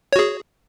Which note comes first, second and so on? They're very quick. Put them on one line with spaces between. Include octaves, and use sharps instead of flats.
C#5 F#4 G#4